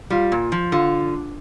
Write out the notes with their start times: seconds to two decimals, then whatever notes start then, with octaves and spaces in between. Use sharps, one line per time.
0.10 G3 F4
0.32 A#2
0.52 F3
0.72 D3 F4